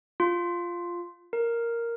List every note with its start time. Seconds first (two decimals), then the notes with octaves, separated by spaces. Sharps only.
0.20 F4
1.33 A#4